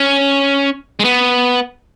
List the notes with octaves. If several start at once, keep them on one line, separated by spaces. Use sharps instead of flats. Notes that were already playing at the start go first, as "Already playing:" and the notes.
Already playing: C#4
G#3
B3